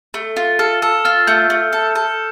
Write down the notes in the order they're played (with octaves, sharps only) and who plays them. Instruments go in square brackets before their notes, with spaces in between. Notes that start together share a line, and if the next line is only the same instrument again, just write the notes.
[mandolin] A3
F4
[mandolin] A4 [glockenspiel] F6
[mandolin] A4 [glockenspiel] E6
[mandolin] F4 [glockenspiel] F6
[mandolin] A3 [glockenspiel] G6
[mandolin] A3
A4
A4